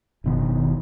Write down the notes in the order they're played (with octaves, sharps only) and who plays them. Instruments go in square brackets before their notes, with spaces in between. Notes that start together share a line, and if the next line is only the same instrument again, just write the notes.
[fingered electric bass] F#1 B2 D#3